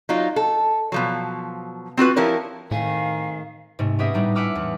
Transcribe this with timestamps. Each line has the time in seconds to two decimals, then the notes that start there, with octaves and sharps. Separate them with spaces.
0.09 F#3 D#4 F4
0.36 A4
0.92 B2 F3 F#3
1.97 C4 F4 F#4 B4
2.16 F3 E4 G4 A#4 C#5
2.71 A2 D#3 A3 C4 G#4 F5
3.79 G#2 C3 A3
3.99 B3 C#4 G4 G#4 D#5 E5
4.14 A2 G3 D4 D#4
4.35 E5 F#5 G#5 D6 E6 F6
4.56 E2